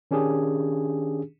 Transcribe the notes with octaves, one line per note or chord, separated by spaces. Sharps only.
D#3 C#4 D4 G4 G#4